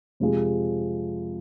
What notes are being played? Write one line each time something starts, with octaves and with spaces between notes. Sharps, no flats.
F2 C3 F3 G#3